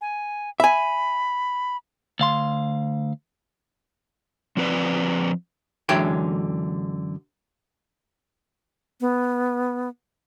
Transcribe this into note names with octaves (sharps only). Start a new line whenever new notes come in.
G#5
E5 G#5 B5
D2 F5 C6
F3 C4 B4 D5
F#2 D3 E3 G#3 C#5 G5
B3